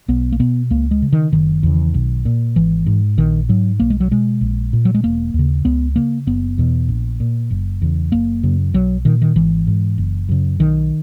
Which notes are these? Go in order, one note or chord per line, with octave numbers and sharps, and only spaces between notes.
B1 B3
A#3
B2 B3
C#2 A#3
G#3
C#3
D#3
F#1 D#3
E2 C#3
B1
A#2
G#1 E3
G#2
A#1 D#3
G#2 F#3
B1 A#3
G#3
F#3
B2 G#3
A#1
A#2
F#3
G#3
E1 A#3
D#2
C#3
C#2 B3
C#3 A#3
F#1 B3
E2 B2
A#1
A#2
F#1
E2 C#3
F#1 A#3
F#2 C#3
B1 F#3
A#2 D#3
D#3
G#1 E3
G#2
F#1
F#2 C#3
B1 D#3